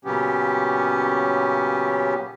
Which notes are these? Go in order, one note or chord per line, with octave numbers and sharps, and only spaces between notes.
A#2 C#3 F#3 B3 C#4 G4